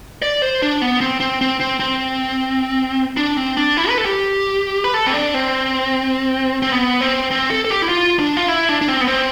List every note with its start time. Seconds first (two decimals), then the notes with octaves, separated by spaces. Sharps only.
0.22 D5
0.42 C5
0.62 D4
0.82 B3
1.01 C4
1.20 C4
1.41 C4
1.60 C4
1.80 C4
3.17 D4
3.37 C4
3.57 D4
3.77 E4
3.89 B4
3.98 A4
4.05 G4
4.84 B4
4.94 A4
5.06 C4
5.14 D4
5.34 C4
6.62 C4
6.72 B3
7.01 C4
7.31 C4
7.50 A4
7.65 A4
7.70 G4
7.82 E4
7.89 F4
8.19 D4
8.37 F4
8.48 E4
8.69 D4
8.81 D4
8.88 C4
9.01 B3
9.08 C4